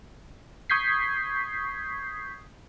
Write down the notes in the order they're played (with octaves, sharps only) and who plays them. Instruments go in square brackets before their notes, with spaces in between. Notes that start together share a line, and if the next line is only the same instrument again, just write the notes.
[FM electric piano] C#6 D#6 G6 G#6 B6 C7